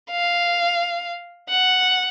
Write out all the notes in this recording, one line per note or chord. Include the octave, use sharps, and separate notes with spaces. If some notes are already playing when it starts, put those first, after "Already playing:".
F5
F#5